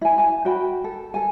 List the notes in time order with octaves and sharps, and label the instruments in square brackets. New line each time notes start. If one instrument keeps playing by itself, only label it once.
[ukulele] E4 G#5
G#5 A5
F#4 G5 B5
A4
G#4 A4 G#5